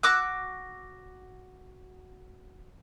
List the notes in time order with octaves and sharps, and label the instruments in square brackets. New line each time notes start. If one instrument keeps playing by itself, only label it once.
[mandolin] F#4 D6 E6 F#6